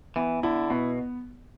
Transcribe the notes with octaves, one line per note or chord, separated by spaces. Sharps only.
E3 B3
D3 E4
B2 B3